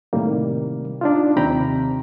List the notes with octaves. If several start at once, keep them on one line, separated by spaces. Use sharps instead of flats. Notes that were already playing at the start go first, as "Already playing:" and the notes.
A2 C3 D#3 G3 A#3
D4 D#4 F4
D#2 C3 C4 G5 A#5 B5